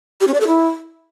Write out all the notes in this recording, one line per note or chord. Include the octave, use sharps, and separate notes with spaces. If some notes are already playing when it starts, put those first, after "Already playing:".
G4
C#4
D5
A4
E4